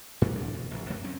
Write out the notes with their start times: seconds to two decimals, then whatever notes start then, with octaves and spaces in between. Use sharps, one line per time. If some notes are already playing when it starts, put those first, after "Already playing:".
0.22 G#2 C3 E3 F3
0.35 G1 D4
0.53 E1
0.71 F1 A#1
0.90 F#2 C3 A3
1.04 F#3 C4 C#4